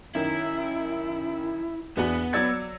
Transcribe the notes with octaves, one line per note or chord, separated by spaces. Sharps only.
F#2 D#3 E4
E2 B3 D4 F#4
F#3 D5 E6 G#6 A6 C#7